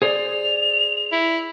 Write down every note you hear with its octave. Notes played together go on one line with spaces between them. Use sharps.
G#4 C5 D5 F7
E4